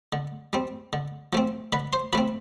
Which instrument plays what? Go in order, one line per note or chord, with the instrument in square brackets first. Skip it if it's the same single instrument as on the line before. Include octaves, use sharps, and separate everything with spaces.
[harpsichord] D3
G3 C4
D3
F3 A3 C4
D3 B4 B5
C5 C6
F3 A3 C4 B4 B5